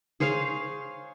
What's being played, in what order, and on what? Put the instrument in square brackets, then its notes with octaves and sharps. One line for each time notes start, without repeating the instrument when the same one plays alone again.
[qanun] G#4 C5 C#5 F5